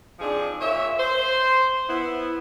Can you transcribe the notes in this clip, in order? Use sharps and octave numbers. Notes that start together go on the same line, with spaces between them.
F3 C4 D4 D#4 G#4
A#2 C#5 E5
C5
B3 E4